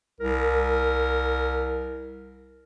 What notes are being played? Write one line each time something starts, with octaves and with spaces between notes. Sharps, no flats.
C2 A#4